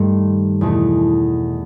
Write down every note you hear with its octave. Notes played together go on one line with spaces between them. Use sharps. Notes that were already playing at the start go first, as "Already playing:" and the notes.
Already playing: G2 D#3 A3 C6
E2 B2 A3